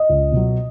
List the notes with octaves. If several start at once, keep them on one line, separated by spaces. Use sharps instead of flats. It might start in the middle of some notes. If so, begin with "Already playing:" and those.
Already playing: D#5
C#2
B2 F#3